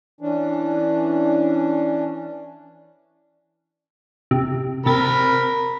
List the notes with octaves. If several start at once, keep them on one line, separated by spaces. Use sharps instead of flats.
E3 C#4 D4
C3
C3 A#4 B5 A6